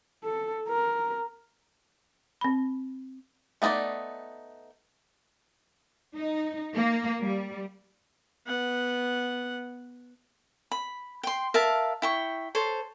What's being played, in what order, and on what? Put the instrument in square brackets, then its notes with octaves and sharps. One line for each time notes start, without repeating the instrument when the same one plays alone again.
[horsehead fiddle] A4
A#4
[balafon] C4 B5
[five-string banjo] A3 B3 D#4 F4 D5
[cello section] D#4
A#3
G3
[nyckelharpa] B3 F#5
[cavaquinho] B5
G5 C6
A#4 E5 F5 A5
E4 G5 C#6
A4 C5 C#5